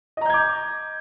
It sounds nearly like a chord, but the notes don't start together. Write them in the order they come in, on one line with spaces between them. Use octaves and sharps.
D#5 A#5 G6 G#6 D6